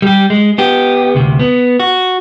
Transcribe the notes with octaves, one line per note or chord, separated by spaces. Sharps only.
G3 G4
G#3
B3 G4
D2 C3
B3
F#4